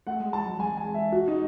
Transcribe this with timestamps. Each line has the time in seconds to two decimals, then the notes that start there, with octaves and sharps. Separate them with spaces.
0.07 A3 F#5
0.20 G#3
0.33 G#3 A5
0.46 F#3
0.59 G#3 G#5
0.77 G#5
0.94 E5
1.12 F#4
1.28 D#4